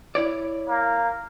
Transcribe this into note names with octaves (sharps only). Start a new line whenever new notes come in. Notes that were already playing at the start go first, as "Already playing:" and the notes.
E4 C#5 D5
A#3